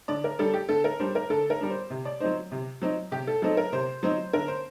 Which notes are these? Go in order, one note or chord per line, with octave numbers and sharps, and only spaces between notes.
D3 D5
A#4
G3 D4 A4
G4
D3 A4
A#4
G3 D4 C5
A#4
D3 A4
A#4
G3 D4
C5
C3
D5
F#3 C4 D#4 C5
C3
F#3 C4 D#4
C3 G4
A4
F#3 C4 D#4 A4
A#4
C3 C5
F#3 C4 D#4 C5
D3 A#4
C5